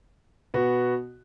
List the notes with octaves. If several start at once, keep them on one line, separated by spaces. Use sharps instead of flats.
B2 B3 F#4